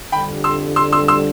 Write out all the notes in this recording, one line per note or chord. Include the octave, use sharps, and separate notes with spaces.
F2 D3 G3 G5 B5
C6 E6
C6 E6
C6 E6
C6 E6